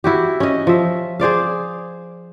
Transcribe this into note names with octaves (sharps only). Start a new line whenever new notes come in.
E4 F#4 G4
C#4 D#5
F3 E5
G#4 C5 D5 F5